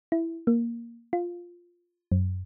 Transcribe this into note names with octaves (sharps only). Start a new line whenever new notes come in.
E4
A#3
F4
F#2